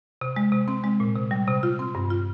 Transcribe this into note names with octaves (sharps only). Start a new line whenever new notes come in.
C3
G#3
C3
C4
G#3
A#2
C3
G3
C3
F4
C4
G2
F4